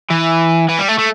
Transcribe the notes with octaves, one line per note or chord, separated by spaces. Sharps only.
E3
E3
G3
A3
A3